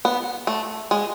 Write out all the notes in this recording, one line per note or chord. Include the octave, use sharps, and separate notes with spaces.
B3
A3
G#3